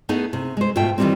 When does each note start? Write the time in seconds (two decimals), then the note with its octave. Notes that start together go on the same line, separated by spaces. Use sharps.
0.09 A3 B3 D#4 E4 G#4 B4
0.33 C3
0.57 G#3 C5
0.76 G#2 B2 A3 F4 E5 G5
0.98 D#3 E3 F#3 G3 A#3 C4